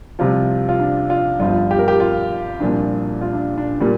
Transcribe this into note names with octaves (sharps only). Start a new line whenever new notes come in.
C2 C3 F3 F4
F4
D4
F4
G1 G2 F3 F4
G4
A#4
G4
F4
C2 A#2 F3 D4
F4
D4
D4
A#2 G3 A#4